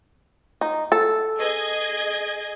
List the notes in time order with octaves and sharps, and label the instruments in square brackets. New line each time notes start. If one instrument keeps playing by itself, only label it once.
[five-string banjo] D#4
A4
[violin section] G#4 D#5 G#6